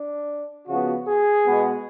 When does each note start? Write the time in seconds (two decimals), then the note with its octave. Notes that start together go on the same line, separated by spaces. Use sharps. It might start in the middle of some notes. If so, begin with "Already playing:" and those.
Already playing: D4
0.67 C#3 F3 B3 F#4
1.07 G#4
1.45 B2 G#3 B3